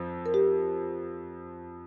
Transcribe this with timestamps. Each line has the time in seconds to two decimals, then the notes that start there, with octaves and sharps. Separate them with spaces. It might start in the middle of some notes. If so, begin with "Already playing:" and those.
Already playing: F2 F3
0.26 A#4
0.34 G4